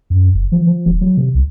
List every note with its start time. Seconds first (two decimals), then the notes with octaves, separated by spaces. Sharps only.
0.10 F#2
0.34 F#1
0.52 F3
0.66 F3
0.86 D#1
1.01 F#3
1.17 C3
1.35 C2